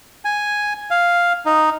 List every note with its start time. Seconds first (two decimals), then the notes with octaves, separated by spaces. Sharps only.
0.25 G#5
0.91 F5
1.46 D#4